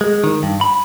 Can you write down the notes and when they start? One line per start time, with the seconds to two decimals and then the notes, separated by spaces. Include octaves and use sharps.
0.01 G#3
0.24 D#3
0.43 G2
0.61 B5